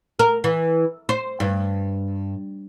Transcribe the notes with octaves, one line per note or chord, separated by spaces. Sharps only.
A#4
E3
C5
G2